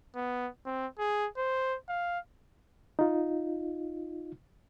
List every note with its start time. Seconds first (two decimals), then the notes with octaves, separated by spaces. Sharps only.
0.16 B3
0.66 C4
0.99 G#4
1.37 C5
1.89 F5
2.99 D#4 F4